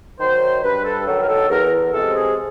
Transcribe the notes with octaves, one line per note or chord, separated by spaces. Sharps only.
D#3 F#3 C5
G2 B4
A4
D#3 F#3 A4
A#4
A4
E2 A#4
C3 F3 G#3 A4
G#4